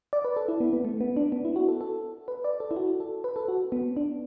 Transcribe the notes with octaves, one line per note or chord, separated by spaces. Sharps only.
D5
B4
A4
E4
B3
B3
A3
B3
D4
B3
E4
F#4
A4
A4
B4
D5
A4
E4
F#4
A4
B4
A4
F#4
B3
D4